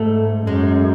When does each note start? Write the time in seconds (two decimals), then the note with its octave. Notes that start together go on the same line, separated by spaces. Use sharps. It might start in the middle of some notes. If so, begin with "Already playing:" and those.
Already playing: G#2 A3
0.46 F#2 G#3